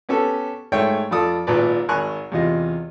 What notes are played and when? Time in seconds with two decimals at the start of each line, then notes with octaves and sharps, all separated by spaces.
0.09 B3 C#4 G4 A4
0.72 G#2 A3 C#5 G5
1.11 F2 F4 A4 D5 D#6
1.47 G#1 A#2 B4 D5
1.89 G#1 A#4 G#5 C#6 F#6
2.32 E2 C3 F4 D#5